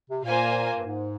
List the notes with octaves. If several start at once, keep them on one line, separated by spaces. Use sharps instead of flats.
C3
A#2 A#3 F4 C5 F5 G#5
G2
G#2